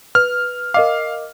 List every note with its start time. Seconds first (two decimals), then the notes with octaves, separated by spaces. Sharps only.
0.15 B4 F6
0.74 A#4 D#5 F5 D6